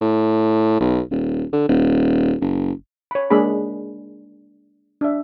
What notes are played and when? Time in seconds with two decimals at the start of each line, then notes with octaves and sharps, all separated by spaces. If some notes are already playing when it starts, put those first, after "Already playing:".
0.01 A2
0.80 B1
1.11 D#1
1.53 D3
1.68 D#1
2.41 F#1
3.11 C#5 B5
3.30 G#3 A#3 D4 G#4 B5
5.01 D4 E5